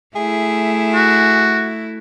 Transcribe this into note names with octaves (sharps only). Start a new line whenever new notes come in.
A3 E4 G#4
F#4